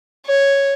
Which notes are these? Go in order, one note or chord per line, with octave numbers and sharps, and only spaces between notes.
C#5